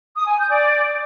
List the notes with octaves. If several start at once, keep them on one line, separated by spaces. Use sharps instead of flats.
D#6
G#5
G6
D5